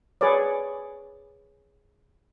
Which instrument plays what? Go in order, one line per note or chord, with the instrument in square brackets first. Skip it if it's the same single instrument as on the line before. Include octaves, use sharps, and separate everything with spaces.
[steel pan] G#4 B4 C#5 D5